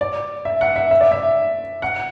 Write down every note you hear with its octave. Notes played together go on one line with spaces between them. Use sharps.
D5
E5
F#5
E5
E5
D5
E5
F#5